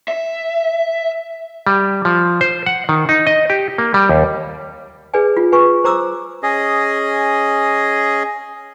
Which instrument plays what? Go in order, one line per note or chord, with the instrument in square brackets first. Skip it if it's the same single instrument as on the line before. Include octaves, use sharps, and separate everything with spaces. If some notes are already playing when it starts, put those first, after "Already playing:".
[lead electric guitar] E5
[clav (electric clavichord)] G3
F3
C5
F#5
D#3
D#4
D#5
G4
A#3
G3
D#2
[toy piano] G#4 B4 D5 G#5
F4
B4 G#5 C#6
C5 A#5 D6 E6
[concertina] C#4 G#4 D#5